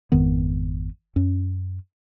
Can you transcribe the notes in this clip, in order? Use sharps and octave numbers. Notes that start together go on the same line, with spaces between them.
G#1 F2 D#3 B3
F#2 C#4